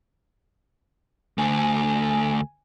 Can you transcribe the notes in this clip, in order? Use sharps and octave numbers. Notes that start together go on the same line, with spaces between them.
D2 A3 G#5